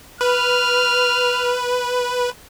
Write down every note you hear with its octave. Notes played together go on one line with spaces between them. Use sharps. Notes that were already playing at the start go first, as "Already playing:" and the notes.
B4 F6